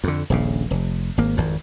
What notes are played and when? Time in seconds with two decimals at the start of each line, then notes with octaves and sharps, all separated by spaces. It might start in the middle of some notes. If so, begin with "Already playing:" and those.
0.04 F2 D3
0.30 D#1 A#1 C#3
0.71 F1
1.17 G#1 A#3
1.37 G#1 F2